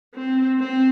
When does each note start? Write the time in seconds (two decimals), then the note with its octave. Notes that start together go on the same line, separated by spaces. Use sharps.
0.14 C4
0.59 C4